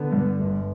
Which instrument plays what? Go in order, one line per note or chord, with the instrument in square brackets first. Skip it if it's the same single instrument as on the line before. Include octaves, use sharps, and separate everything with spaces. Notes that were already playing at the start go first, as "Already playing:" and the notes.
Already playing: [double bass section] D3 [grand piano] B3
[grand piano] G2
G1